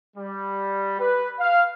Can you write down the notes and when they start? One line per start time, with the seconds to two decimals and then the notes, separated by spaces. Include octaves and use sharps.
0.15 G3
0.99 B4
1.38 F5